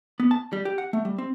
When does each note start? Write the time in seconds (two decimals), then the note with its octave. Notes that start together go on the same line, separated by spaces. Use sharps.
0.20 B3
0.31 A5
0.53 G3
0.65 G4
0.78 F#5
0.93 A3
1.05 G3
1.18 C4